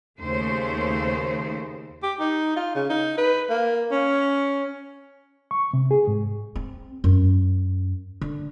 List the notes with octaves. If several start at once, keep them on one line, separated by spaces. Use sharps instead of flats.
D#2 C#3 A3 C5
G4
D#4
F4
C#3
D#4
B4
A#3
C#4
C#6
C3
G#4
G#2
C4
F#2
D3